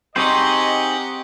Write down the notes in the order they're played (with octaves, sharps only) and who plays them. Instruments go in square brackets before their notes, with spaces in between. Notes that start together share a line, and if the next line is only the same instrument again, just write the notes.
[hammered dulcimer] C4 C#6 [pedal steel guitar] D#4 G#4 C5 [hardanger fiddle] G4 F#5 [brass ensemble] D#5